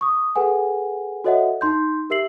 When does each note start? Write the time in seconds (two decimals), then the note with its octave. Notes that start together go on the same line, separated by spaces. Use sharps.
0.01 C#6 D#6
0.36 G#4 A4 B4 F#5 G#5
1.24 F#4 A4 C#5 D#5 E5 F#5
1.61 D#4 C6 G6
2.10 G4 A#4 E5 E6 C7 F#7